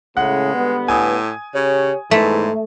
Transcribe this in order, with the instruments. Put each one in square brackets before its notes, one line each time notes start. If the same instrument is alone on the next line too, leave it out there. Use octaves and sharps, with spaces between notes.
[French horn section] A2 C#3 [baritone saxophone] G#3 [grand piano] F#5
[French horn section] D3 G3 B3
[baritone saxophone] A2 [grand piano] G#5 D#6
[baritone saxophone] C#3 [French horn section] G4 C#5
[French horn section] E2 D#3 E3 [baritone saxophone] G#2 [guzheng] A3